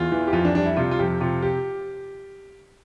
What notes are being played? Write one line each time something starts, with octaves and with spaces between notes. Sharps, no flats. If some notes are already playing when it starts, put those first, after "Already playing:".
Already playing: E2 F4
E3
G4
F2 F4
D4
G3 D4
E4
C3 F4
F4
F2 G4
C3 F4
G4